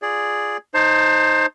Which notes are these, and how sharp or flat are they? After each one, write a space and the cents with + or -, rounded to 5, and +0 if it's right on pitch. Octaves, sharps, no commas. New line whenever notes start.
F4 +0 G#4 +0 D5 +0
D#4 +0 C5 +15 A5 +20